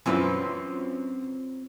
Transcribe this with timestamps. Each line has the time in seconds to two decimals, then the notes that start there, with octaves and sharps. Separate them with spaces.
0.06 F#2 E3 C4 F4 B4